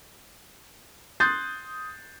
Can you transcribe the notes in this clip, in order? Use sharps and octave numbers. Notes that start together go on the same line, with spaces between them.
C6 D#6 F#6 G6 A6 C7